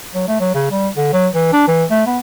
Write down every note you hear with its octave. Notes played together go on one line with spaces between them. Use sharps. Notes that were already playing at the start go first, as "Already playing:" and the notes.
F#3
A3
F#3
C#3
G3
D3
F#3
E3
D4
E3
A3
B3